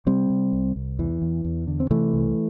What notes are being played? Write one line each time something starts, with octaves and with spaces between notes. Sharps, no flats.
C3 G3 C4
C3
C2
C2
E2 E3
E2
E2
D3
C4
C3 E3 A3
C2